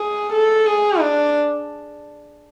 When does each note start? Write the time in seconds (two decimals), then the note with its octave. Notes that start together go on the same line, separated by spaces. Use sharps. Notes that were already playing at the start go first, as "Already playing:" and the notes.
Already playing: G#4
0.33 A4
0.66 G#4
1.00 D4